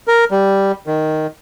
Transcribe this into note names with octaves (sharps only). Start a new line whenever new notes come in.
A#4
G3
D#3